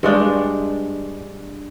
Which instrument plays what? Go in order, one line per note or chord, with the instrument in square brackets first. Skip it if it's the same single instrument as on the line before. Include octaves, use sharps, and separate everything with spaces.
[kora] G2 G#3 D4 G5